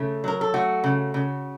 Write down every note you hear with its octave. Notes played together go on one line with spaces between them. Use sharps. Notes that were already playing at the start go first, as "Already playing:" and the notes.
Already playing: C#3 A3
F#3 A#4
A4
A3 F#4
C#3
C#3